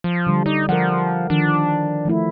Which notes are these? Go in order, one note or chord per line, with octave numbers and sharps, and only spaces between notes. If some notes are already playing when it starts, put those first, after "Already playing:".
F3
D3 G3
D#4 D5
F3 A#4 F#5
D#3 F3 D4
F3 A3 E4